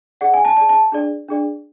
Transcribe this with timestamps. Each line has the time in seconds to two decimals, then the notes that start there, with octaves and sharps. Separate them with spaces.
0.21 G#4 D5 F#5
0.34 G#5
0.45 A5
0.57 G#4 D5 A5
0.69 A5
0.92 D4 G#4 D5
1.28 D4 G#4 D5